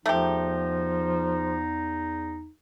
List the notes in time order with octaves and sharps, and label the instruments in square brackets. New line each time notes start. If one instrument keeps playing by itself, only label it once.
[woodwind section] E2 D#4 [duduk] F3 [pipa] A3 G4